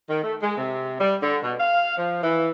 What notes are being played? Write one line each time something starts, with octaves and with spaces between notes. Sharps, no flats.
D#3
A3
G#3
C3
G3
D3
B2
F5
F3
E3